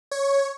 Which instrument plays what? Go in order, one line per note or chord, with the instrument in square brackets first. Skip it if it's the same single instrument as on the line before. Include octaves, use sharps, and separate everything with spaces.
[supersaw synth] C#5